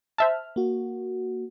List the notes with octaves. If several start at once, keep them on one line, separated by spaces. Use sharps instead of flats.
C5 E5 A5 F6
A#3 F#4